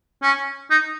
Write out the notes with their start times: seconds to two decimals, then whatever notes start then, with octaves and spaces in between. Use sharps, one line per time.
0.22 C#4
0.70 D#4